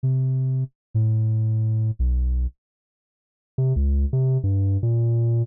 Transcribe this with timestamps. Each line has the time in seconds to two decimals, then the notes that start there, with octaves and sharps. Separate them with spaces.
0.03 C3
0.94 A2
1.99 B1
3.58 C3
3.76 C#2
4.13 C3
4.44 G2
4.83 A#2